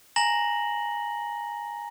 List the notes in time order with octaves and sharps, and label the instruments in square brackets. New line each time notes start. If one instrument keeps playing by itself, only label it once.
[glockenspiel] G#5 A#5 A#6 F#7